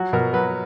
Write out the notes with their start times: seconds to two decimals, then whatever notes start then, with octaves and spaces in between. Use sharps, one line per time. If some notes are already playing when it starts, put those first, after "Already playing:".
Already playing: F#3 F#4
0.13 B2 A#4
0.33 F#3 B4